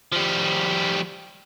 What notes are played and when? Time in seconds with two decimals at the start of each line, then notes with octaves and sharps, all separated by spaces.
0.12 F3 G3